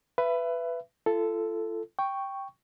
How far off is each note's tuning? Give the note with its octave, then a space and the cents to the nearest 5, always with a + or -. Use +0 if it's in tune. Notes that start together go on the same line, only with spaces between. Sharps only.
B4 +10 E5 +30
F4 -35 A4 +0
G5 +0 C#6 +0